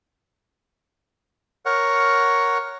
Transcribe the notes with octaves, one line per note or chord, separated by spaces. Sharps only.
A#4 C#5 F#5